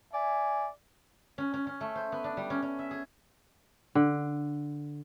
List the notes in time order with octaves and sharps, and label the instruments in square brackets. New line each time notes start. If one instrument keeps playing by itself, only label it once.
[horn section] D5 E5 G#5
[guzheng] C#4
C#4
C#4
A3
C5
B3
D4
G3
C#4
C#4
E5
G#4
[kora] D3